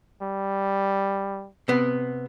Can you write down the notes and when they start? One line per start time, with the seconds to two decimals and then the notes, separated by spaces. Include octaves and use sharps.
0.22 G3
1.68 C3 B3